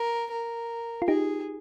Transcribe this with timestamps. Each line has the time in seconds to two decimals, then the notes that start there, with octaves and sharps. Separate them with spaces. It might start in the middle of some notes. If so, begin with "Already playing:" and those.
Already playing: A#4
0.31 A#4
1.02 F4
1.08 D#4 G4 G#4